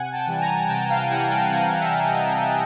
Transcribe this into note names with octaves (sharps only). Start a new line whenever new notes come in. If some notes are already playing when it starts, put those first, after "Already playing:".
Already playing: C3 F#5 G#5
G5 A5
E3 G3
G#5 A#5
C3 G5 A5
F5 G5
E3 G3 F#5 G#5
G5 A5
C3 F#5 G#5
E5 F#5
E3 G3
D#5 F5
C3